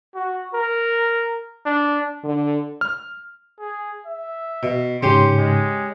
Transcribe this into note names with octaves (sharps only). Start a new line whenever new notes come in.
F#4
A#4
D4
D3
F6
G#4
E5
B2
G#2 C#3 C#4 G4 C6
G#3